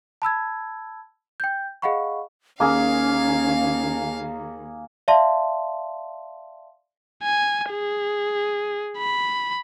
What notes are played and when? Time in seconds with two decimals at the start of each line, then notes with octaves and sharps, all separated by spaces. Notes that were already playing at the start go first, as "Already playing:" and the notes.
0.22 A5 B5 E6 G#6
1.40 G5 G6
1.82 G#4 D#5 F5 F#5 B5 C#6
2.60 D#2 A#3 C#4 G#4 F5
5.08 D5 E5 F5 A5 C6
7.23 G#5
7.71 G#4
8.98 B5